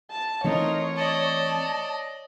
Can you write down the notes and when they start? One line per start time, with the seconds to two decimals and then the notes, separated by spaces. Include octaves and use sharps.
0.11 A5
0.44 E3 A3 C4 D#4 F4 A#4 C#5
0.96 D5 D#5 A5